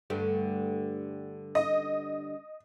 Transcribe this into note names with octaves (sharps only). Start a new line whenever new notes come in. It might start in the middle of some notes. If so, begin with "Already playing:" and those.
G2 D3 A3
D#5